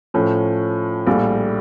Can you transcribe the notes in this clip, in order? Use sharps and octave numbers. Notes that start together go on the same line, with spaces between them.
A2 F3 C#4
A#1 A2 G3